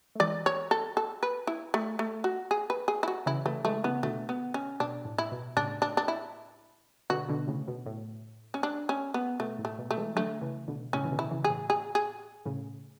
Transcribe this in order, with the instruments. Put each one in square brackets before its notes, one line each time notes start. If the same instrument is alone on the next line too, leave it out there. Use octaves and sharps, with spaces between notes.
[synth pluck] A3
[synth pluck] E3 G#3 [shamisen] D5
[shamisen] C#5
A4
A4
B4
E4
A3
A3
F#4
G#4
B4
G#4
E4
F#4
[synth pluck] C#3 E3 [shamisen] E4
[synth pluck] C#3 E3 [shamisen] A3
[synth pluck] E3 G#3 [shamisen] A3
[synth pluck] C#3 E3 [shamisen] B3
[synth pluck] B2 D3 [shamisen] A3
[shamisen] B3
C#4
[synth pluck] B2 [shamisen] D4
[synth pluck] A2
[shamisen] E4
[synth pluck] B2
[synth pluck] A2 C#3 [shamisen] D4
[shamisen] D4
D4
E4
[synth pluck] B2 D3 [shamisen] F#4
[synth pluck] B2 D3
A2 C#3
B2
A2
[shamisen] C#4
D4
C#4
B3
[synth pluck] B2 [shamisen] A3
[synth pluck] A2
[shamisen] A3
[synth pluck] B2
[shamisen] A3
[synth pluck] E3 G#3
[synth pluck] D3 F#3 [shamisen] A3
[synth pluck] C#3 E3
B2 D3
[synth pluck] A2 C#3 [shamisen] C#4
[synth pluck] E3
B2 D3
[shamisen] E4
[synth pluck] C#3 E3
[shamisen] G#4
[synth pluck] A2
[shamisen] G#4
G#4
[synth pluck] A2 C#3